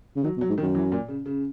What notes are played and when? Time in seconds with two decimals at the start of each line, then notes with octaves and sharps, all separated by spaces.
0.16 C#3
0.24 D#3 F#3
0.37 B2
0.41 F#3
0.49 G#2
0.58 D#3
0.62 F#2
0.75 E3
0.92 A#2
1.08 C#3
1.26 C#3